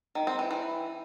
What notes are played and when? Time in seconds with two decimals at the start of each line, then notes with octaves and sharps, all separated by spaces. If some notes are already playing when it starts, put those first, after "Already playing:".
0.15 D#3
0.27 C4
0.39 E3
0.51 E3